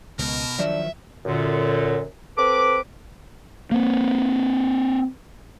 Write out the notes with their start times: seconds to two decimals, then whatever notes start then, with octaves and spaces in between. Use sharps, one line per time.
0.19 C#2 B2 A#4
0.59 D#3 F3 F#3 D4 E5
1.25 F#2 A#2 D3
2.37 C4 A4 B4 D6
3.71 A#3 C4